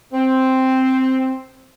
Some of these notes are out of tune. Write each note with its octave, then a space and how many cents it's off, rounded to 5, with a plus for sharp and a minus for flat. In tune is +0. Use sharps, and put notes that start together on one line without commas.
C4 +0